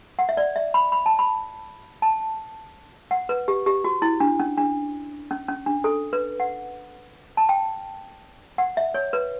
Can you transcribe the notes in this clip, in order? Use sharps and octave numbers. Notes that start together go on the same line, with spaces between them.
F#5
E5
D5
E5
B5
B5
A5
B5
A5
F#5
B4
G4
G4
F#4
E4
D4
C#4
D4
C#4
C#4
D4
A4
B4
F#5
A5
G5
F#5
E5
C#5
B4